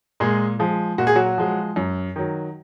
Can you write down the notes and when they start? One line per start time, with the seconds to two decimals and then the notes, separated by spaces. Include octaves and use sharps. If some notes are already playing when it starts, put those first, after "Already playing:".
0.20 A#2 G#3 G#4
0.59 F3 G#3
0.98 A#2 F#4
1.07 G#4
1.15 F#3 F#4
1.38 F3 G#3
1.76 F#2
2.16 D#3 F#3